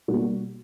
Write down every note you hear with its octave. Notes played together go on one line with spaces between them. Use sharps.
B2 G3 A#3 F#4